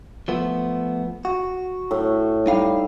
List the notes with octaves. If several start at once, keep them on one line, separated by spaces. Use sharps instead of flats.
F3 A3 B3
F#4
A2
G3 D#4 F5